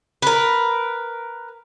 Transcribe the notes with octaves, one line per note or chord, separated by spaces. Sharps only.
A#4 B4